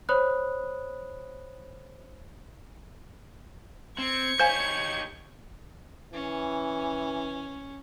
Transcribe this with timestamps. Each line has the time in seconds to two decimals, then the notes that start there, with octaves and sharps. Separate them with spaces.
0.09 C5 C#5 B5 D#6 F#6
3.98 C4 G#6 C#7
4.40 D#4 G4 C5 C#5 F5 G#5
6.14 E3 C#4